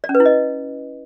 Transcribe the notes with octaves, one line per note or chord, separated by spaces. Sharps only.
D5
C#4
B4
E4
D#5